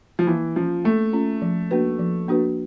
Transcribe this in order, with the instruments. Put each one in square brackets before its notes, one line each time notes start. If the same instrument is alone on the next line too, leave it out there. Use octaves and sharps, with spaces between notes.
[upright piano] F3
[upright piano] E3 [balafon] A#3
[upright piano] F3 [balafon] C#4 F4
[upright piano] A3 [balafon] A#3
[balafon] C#4 F4
F3
A#3 D4 F#4 B4
F3
A#3 D4 F#4 B4